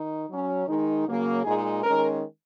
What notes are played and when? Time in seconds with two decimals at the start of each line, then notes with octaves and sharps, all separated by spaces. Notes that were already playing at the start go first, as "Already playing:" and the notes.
Already playing: D#3 D#4
0.28 F#3 C#4
0.67 D#3 G#3 D#4
1.05 C#3 F#3 A#3
1.44 A#2 G#3 D#4 G#4
1.83 D#3 G#3 C#4 A#4